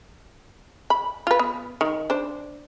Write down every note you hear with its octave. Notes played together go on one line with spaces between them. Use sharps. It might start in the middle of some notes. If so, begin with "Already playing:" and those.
B5
F4 B4
B3
D#3
D4 C5